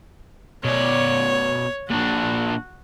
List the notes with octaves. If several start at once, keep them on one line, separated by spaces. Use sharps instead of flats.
B2 C#5 D5
A#2 D4 F#4